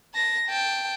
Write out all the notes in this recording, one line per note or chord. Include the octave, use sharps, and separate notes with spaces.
A5 A#6
G5 A5